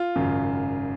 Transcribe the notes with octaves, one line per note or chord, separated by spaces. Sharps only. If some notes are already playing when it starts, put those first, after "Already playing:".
Already playing: F4
G#1 F#2 C#3